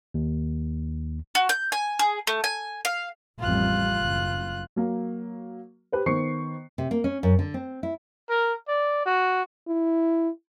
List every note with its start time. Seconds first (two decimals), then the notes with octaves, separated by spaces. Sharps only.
0.14 D#2
1.35 F#4
1.49 G6
1.72 G#5
1.99 G#4
2.27 A3
2.44 G#5
2.85 F5
3.39 A1 F2 G3 F4 F#6
3.95 F#1
4.76 F#3 A#3
5.92 G4 B4 C5
6.06 D#3 B3 C5 C#6 C7 C#7
6.78 C3
6.91 A#3
7.04 C#4
7.23 F#2
7.39 D3
7.54 C4
7.83 E4
8.29 A#4
8.68 D5
9.06 F#4
9.68 E4